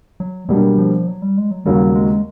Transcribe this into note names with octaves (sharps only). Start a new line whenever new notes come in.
F#3
B2 F#3 G3 A#3 D4
F3
F#3
G3
G#3
F#3
D#2 C#3 F#3 G3 A#3
G#3